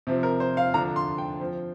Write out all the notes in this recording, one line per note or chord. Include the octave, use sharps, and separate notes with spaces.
C3 F3 C4
A#4
C5
F5
D3 F3 D4 A#5
C6
G5
F3 C4